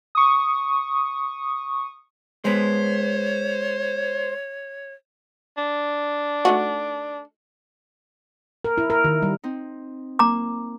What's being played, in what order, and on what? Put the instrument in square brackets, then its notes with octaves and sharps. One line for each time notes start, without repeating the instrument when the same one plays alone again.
[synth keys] C#6 D#6
[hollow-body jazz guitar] G#3 B3 [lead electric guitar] C5 [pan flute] C#5
[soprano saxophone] D4
[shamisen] A3 D#4 F#4
[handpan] A#4
E4
A#4
D#3
G3
[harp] C4 D#4
[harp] A#3 [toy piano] A#5 D6